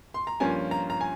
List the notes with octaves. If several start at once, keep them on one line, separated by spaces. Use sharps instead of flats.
C6
A#5
G2 F3 A#3 C#4 F4 G#5
A#5
A#5
G#5